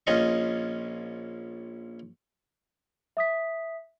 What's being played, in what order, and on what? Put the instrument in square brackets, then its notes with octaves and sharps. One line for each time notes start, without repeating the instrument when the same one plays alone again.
[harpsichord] A#1 C#4 F4 D#5 C#6
[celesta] E5 D#6 B6